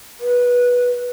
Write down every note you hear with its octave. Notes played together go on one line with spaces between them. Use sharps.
B4